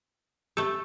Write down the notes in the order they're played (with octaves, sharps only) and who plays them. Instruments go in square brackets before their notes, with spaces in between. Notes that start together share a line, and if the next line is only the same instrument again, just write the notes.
[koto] A3 A4 [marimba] G4